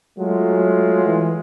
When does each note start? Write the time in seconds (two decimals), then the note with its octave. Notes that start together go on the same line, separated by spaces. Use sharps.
0.19 F#3 G#3 A3 F4
1.06 E3